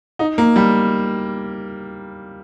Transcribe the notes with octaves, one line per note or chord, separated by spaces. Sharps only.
D#4
A#3
G3